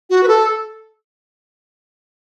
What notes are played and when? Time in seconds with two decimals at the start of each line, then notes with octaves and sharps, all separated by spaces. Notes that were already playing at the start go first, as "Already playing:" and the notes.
0.10 F#4
0.23 B4
0.28 A4